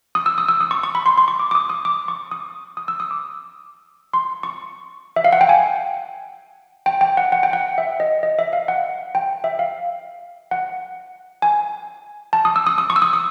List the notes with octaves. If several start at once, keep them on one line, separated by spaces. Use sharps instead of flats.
D#6
E6
D#6
E6
D#6
C#6
C#6
B5
C6
C6
C#6
D6
D6
D#6
D#6
D6
C#6
D#6
D#6
E6
D#6
D6
C6
C#6
E5
F5
F#5
G5
G#5
G5
G5
F#5
F#5
G5
F#5
E5
D#5
D#5
E5
F5
F#5
G5
E5
F5
F#5
G#5
A5
D#6
E6
D#6
D#6
C#6
E6
D#6
D#6